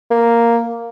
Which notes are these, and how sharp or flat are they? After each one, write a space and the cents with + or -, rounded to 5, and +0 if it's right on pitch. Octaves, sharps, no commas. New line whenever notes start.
A#3 +0